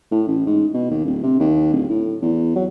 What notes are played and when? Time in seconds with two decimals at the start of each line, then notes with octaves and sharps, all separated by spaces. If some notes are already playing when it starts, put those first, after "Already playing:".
0.11 A2
0.28 A1
0.46 G#2
0.74 B2
0.90 D#2
1.05 D1
1.23 C3
1.39 D#2
1.73 D1
1.89 A2
2.22 E2
2.56 F#3